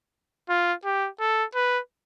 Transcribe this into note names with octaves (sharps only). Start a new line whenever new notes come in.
F4
G4
A4
B4